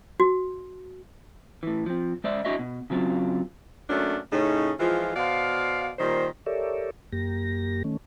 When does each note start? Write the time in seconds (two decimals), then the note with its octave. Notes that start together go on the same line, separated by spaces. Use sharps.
0.20 F#4
1.63 A2 E3
1.86 F3 C4
2.24 G#3 C5 D5 E5
2.45 D4 E4 F#4 C#5 D#5 E5
2.59 B2
2.90 C#3 F#3 C4 F4
3.89 F#3 A3 A#3 C#4 D4
4.32 A2 C#3 C#4 D#4
4.80 E3 F3 G#3 F4
5.16 B2 C5 D5 F5
5.99 A#2 D#3 G3 C5
6.46 G4 A4 A#4 C#5 D5 E5
7.12 F#2 A#3 G4 A#6
7.84 D#3 A3 C#4